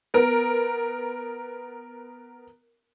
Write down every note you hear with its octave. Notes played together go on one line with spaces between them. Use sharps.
B3 A#4